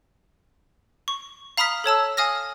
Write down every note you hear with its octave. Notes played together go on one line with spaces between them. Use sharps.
C#6
F5 A#5 B5 D#6 F6 B6
A4 C#5 A5 E6
F5 G#5 D#6 F6 A#6